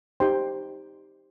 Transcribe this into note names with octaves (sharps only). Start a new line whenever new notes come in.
D#4 G4 C5 G5 C6